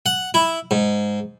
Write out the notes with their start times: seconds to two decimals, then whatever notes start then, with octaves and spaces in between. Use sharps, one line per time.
0.06 F#5
0.34 E4
0.71 G#2